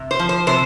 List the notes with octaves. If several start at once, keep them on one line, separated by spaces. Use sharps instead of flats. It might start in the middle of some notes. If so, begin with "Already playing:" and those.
Already playing: C3
C5
F3
C5
C3 C5